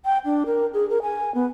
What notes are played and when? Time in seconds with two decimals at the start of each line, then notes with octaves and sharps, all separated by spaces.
0.05 G5
0.25 D4
0.46 A#4
0.73 G#4
0.90 A#4
1.02 G#5
1.34 B3